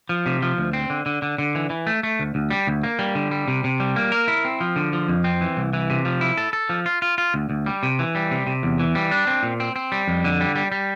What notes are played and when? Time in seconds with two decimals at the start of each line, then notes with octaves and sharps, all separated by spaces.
0.09 F3
0.26 C3
0.42 F3
0.58 D2
0.73 C4
0.90 D3
1.06 D3
1.22 D3
1.38 D3
1.55 E3
1.70 E3
1.87 A3
2.03 A3
2.19 D2
2.35 D2
2.50 G3
2.67 D2
2.84 A#3
2.99 G3
3.15 D3
3.31 G3
3.48 C3
3.64 C3
3.80 G3
3.96 A#3
4.12 A#4
4.28 E4
4.45 C4
4.61 F3
4.76 D3
4.93 F3
5.08 F2
5.24 C4
5.41 E3
5.57 C2
5.73 E3
5.90 C3
6.05 F3
6.21 E4
6.38 A4
6.53 A4
6.69 F3
6.86 F4
7.02 F4
7.18 F4
7.34 D2
7.50 D2
7.66 G3
7.83 C3
7.99 E3
8.15 G3
8.31 C3
8.47 C3
8.63 E2
8.80 E3
8.95 G3
9.11 D4
9.27 C4
9.43 A#2
9.60 C4
9.76 C4
9.92 G3
10.08 F2
10.24 D3
10.41 G3
10.55 G3
10.72 G3